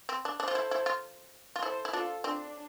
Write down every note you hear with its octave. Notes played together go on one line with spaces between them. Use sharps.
C4
D4
D4 A4 C5
F4
E4
E4
F4
F4
E4 A4 C5
E4
D4 F4 A4
C4 D4